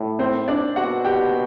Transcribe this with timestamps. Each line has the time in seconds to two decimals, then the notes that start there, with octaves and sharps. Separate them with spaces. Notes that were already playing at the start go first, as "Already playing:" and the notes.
Already playing: A2
0.19 C4 C5
0.48 D4 D5
0.76 B2 F#4 F#5
1.05 G4 G5